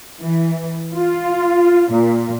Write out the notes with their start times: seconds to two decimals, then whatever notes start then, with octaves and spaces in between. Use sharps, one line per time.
0.20 E3
0.94 F4
1.92 A#2